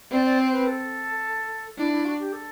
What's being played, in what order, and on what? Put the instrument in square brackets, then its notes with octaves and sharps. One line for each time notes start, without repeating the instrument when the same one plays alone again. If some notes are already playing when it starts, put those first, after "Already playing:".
[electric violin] C4 [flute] D5
[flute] D5
C5
B4
A4
[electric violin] D4 [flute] E4
[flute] E4
F#4
G4
A4